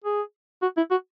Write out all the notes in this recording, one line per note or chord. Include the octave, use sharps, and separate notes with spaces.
G#4
F#4
E4
F#4